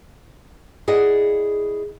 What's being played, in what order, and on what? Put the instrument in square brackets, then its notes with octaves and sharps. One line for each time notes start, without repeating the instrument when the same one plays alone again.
[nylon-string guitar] E4 G#4 D5 D#5 F#5